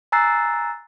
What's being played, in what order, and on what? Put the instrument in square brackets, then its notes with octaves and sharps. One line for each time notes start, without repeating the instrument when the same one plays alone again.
[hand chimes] G#5 A#5 E6 F#6 A6 C7